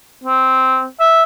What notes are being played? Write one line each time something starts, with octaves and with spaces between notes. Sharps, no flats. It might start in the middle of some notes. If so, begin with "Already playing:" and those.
C4
E5